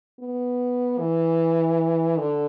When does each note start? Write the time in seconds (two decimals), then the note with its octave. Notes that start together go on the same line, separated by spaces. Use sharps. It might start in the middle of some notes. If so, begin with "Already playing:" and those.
0.19 B3
0.99 E3
2.18 D3